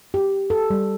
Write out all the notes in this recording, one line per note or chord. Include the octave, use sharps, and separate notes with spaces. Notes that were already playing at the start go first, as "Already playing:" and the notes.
G4
A4
G3